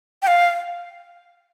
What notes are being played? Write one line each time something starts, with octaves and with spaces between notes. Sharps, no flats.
G5
F5